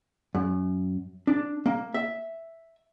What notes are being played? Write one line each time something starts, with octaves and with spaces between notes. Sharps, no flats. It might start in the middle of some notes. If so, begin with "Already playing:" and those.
F#2
D4
A#3
E5